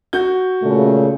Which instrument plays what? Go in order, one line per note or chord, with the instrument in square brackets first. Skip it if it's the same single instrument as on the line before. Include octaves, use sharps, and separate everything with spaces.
[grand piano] F#4 G6
[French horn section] A#2 C#3 A3